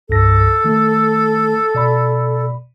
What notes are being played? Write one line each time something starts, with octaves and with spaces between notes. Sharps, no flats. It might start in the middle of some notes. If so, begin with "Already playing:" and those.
C2 G2 A4 A#6
D#3 A3
B2 D5 B5